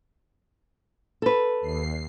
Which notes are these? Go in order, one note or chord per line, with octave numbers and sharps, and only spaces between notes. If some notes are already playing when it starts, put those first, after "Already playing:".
A4 B4
D#2 C7